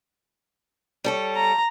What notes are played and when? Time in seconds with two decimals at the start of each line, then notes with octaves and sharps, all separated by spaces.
1.04 G3 A4 C#5
1.36 A#5